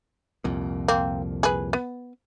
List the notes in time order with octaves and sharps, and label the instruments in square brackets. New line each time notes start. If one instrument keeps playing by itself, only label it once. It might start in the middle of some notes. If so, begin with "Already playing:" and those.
[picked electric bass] C2 F2 A#2
[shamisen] A#3 C4
G#4 B4
B3